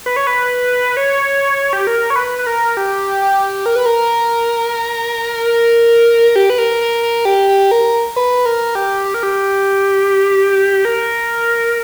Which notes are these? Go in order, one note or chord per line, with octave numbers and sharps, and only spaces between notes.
B4
C#5
B4
C#5
G4
A#4
C#5
B4
B4
A#4
G4
G4
A#4
B4
A#4
A#4
G4
B4
A#4
A#4
A#4
G4
G4
A#4
B4
A#4
G4
G4
A#4
G4
A#4